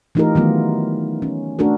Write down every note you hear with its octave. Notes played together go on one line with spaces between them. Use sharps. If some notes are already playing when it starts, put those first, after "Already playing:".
E3 A3 D#4 F4 G4 A#4
D#3 E3 F#3 A3 B3 F4
C#4
A3 D4 F#4 A4 A#4